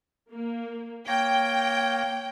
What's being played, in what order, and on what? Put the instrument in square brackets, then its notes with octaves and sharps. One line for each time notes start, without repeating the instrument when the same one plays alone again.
[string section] A#3
[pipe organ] A#3 C#5 A#6 [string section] G5